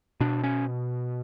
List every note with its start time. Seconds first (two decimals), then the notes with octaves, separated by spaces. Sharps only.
0.20 B2 D4
0.44 C#4